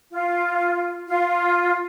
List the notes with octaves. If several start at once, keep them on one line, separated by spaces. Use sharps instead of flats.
F4
F4